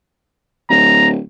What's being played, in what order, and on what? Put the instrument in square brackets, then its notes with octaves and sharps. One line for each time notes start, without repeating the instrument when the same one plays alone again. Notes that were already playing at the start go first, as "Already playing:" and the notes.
[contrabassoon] D1 [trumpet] A#5